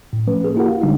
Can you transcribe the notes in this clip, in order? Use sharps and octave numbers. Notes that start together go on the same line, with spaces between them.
A2
F3 A3 C#4 B4
A#3 G#4 A4
A#3 E4 F#4 G4 A#4 F#5
F5
D3 G3 G#3 D4 D#4